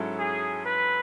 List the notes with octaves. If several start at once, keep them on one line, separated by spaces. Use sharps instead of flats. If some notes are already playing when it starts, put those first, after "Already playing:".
Already playing: G#2 F#3 C#4 E4 A4
G#4
B4